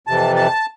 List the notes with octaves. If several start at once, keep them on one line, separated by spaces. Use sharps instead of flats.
F2 C3 E3 A5
A5